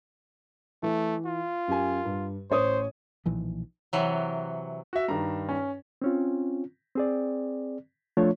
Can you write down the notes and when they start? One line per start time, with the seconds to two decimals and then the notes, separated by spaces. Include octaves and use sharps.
0.83 E3 A3
1.26 F4
1.68 F#2 G4 G#5
2.05 G2
2.51 A1 C5 C#5 D#6
3.26 B1 A#2 E3 F3
3.93 C3 E3 F#3
4.93 F#4 E5
5.08 G2 D#3 A#5
5.49 C#4
6.02 C4 C#4 F4
6.95 C4 G#4 D5
8.17 F3 A3 D4 F4 C#5